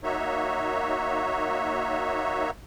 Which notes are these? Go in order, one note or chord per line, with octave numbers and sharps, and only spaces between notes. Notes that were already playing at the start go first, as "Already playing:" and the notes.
A#3 D#4 F#4 C#5 E5